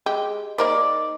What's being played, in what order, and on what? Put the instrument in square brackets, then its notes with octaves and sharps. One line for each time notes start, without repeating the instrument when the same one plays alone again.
[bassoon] G#3 [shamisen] G4
[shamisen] A#3 A#4 C5 [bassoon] D#4 [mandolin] D5